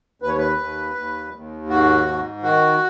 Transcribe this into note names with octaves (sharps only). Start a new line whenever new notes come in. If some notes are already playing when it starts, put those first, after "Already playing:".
D#2 B4
C#5
B4
D#2
D#2
D#2
G#2 F#4
G#2
D#3 F#4